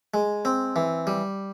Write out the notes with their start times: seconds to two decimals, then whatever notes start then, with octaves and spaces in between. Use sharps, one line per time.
0.14 G#3
0.45 C4
0.76 E3
1.07 G3